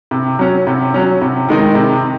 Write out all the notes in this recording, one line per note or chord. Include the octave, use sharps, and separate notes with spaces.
C3
F#3 C#4
C3
F#3 C#4
C3
D#3 G#3 D#4
C3